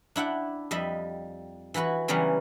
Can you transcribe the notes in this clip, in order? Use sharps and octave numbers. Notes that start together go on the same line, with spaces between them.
D4 E4 F#5 G5
F2 G3 D#5 E5 B5
E3 E4 F#4 B4 B5
C#3 E3 F#3 G3 B3 C#4